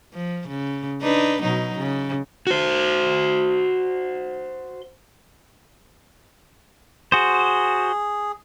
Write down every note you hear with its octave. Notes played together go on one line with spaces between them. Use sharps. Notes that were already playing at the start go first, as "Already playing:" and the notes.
F3
C#3
D4 D#4 B4
B2 F#3 D#4
C#3
F#4 C5
F#4 G#4 C5